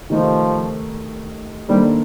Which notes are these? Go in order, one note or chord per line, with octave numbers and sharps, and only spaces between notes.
C3 D#3 F3 A3 D#4
D#3 G3 A#3 D4 A4 C5